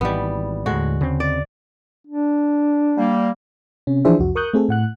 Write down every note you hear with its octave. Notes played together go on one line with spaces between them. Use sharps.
G#1 E3 G3 B3
D#2 A2 D3 G#3 F#4
C#3 C4
D5
D4
G3 A#3
C3 C#4
E3 F3 D4 G#4 C5 E5
C2 F2 F#4
A#4 C#6 D#6 F#6 G6
A3 C4 G#4 A4
A2 F#5 F#6